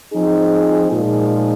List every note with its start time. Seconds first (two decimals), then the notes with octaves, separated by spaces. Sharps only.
0.12 F3 C4 D#4 G#4
0.91 A#2 F3 G#3 D#4 G#4